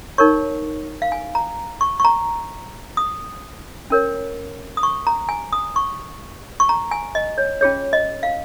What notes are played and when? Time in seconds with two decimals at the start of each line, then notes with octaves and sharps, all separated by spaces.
0.18 D#4 A#4 C#5 C#6
1.02 F5
1.12 G#5
1.35 A#5
1.81 C#6
2.00 C#6
2.05 A#5
2.97 D#6
3.90 C#4 A#4 C#5
4.77 D#6
4.83 C#6
5.07 A#5
5.29 G#5
5.53 D#6
5.76 C#6
6.60 C#6
6.69 A#5
6.91 G#5
7.15 D#5
7.38 C#5
7.61 C#4 F4 G#4 C#5
7.93 D#5
8.23 F5